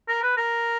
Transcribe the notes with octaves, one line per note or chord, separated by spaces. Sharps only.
A#4
B4
A#4